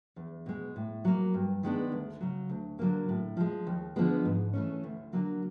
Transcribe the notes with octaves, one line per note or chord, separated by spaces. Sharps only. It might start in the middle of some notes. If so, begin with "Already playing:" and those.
E2
B2 G#3
A2
F#3 A#3
G2
D#3 G#3 B3 D4
D2
C#3 F#3
D2
D3 F#3 A#3
A2
F3 G#3
D#2
D3 F3 G#3 B3
G#2
E3 A3 C#4
D2
D3 F#3 A#3